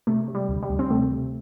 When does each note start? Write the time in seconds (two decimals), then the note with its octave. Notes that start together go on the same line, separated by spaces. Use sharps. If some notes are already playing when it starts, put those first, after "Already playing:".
0.07 C3 A3
0.28 C3
0.35 G3
0.49 D2
0.63 G3
0.70 D2
0.79 C4
0.91 C3 A3
1.12 C3